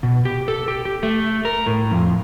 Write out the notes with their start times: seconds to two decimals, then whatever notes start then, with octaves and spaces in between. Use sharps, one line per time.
0.03 B2
0.25 G4
0.48 A4
0.68 G4
0.85 G4
1.03 A3
1.45 A#4
1.67 A2
1.91 F2